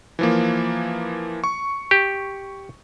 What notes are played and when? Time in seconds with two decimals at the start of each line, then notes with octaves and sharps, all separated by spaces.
0.19 E3 F3 A#3
1.44 C#6
1.91 G4